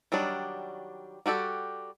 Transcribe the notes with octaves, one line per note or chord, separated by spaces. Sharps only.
D#3 F#3 G3 D4
G3 F#4 G4 A4